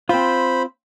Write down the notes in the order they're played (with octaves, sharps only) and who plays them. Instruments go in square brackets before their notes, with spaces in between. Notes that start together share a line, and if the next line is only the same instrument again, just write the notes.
[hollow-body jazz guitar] C4 F4 [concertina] C5 B5